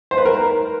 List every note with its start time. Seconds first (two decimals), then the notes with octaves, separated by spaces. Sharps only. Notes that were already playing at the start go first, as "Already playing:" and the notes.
0.11 C5
0.17 B4
0.25 A#4